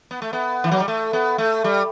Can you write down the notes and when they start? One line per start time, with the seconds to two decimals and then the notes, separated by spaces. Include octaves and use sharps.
0.11 B3
0.22 A3
0.33 B3
0.64 E3
0.71 F#3
0.80 G3
0.88 A3
1.13 B3
1.38 A3
1.64 G3